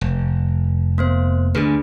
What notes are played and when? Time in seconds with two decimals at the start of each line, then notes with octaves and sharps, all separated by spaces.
0.01 F1
0.98 A#3 B3 C5
1.55 D2 G2 D3 D4 G#4 B4